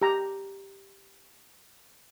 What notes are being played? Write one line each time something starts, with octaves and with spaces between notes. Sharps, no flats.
G4 A#5